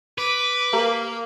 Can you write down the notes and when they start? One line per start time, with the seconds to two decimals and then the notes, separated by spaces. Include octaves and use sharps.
0.18 B4 D6
0.73 A#3 G4 A5 A#5